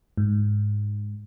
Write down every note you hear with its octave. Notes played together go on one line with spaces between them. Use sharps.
G#2